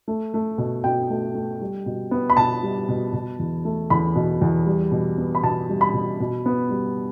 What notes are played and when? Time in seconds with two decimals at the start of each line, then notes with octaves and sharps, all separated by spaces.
0.08 A3
0.34 A3
0.58 B2
0.84 B2 G5
1.10 A3
1.35 A3
1.61 G3
1.86 B2
2.11 B3
2.30 B5
2.37 B2 A5
2.63 G3
2.88 B2
3.13 B2
3.39 E2
3.65 A3
3.90 E2 B5
4.15 B2
4.41 E2
4.66 G3
4.92 B2
5.18 B3
5.35 B5
5.43 B2 A5
5.69 G3
5.81 B5
5.93 B2
6.20 B2
6.46 B3
6.70 G3